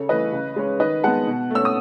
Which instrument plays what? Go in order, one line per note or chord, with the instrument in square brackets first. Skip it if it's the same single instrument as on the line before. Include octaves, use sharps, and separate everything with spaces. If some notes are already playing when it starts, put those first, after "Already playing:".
Already playing: [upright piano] C#3 A4 C#5
E3 A3 B4 D#5
C#3
G#3 C#4
D#3 B4 D#5
G#3 B3 F#5 A5
B2
A3 C#4 E6
D#6